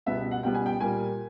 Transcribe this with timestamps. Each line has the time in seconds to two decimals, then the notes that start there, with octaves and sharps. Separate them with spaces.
0.06 C#2 B2 G3 B3 E5
0.31 F#5
0.43 C#2 B2 G3 B3 G5
0.54 G#5
0.66 G5
0.80 A#2 G3 A#3 G#5